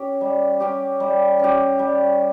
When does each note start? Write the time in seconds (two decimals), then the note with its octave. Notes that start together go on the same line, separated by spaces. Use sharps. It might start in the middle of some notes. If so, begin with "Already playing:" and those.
Already playing: C#4 G4
0.21 G3
0.60 C#4 G4
1.00 G3
1.39 C#4 G4
1.79 G3